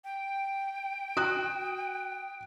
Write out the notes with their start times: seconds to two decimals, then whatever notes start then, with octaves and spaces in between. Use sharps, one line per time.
0.04 G5
1.17 F#4 D#6 F#6